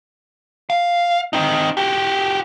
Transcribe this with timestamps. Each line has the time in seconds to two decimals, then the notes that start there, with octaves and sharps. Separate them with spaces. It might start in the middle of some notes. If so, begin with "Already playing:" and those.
0.70 F5
1.33 C4 D#4
1.77 F#4 G4